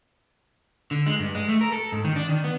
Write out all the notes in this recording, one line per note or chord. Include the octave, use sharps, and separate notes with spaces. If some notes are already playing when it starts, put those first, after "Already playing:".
D3
G#3
G2
G#3
A3
A#4
A4
G#2
D#3
D4
D#3
B3